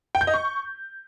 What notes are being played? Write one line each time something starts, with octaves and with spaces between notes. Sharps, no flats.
G5
G6
D#5
C#6